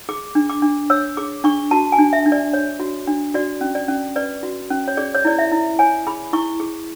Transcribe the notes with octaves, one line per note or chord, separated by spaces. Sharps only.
G#4 D6
D4
D6
D4
C#5 E6
G#4 D6
D4 C#6
F#4 A5
G#5
D4
E5
D4
D5
C#5
F#4
D4
F#4 D5
C#4
D5
C#4
B4 D5
F#4
C#4
C#5
G#4 D5
C#5
E4 D5
E5
E4
C#5 G#5
G#4 B5
E4 C#6
G#4